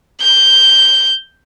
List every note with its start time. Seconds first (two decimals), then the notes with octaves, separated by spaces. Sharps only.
0.21 G6